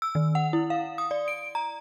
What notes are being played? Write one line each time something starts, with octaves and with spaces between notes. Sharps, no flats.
E6
D#3
F#5
E4
F5
D#6
D5
D7
A#5